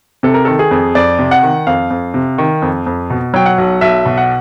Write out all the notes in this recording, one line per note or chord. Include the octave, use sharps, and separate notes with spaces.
C3 A4
A#4
D#3 A4
G#4
F2
F2 D5
C3
F#5
D#3
F2 F5
F2
C3
D#3
F2
F2
B2
F#3 G5
F#5
B1
B1 E5
B2
F#5